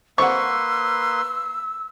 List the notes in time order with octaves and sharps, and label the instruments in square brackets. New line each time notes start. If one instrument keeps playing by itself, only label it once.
[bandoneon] A#3 B4 C6 [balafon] C5 F#5 [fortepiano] C#6 [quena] E6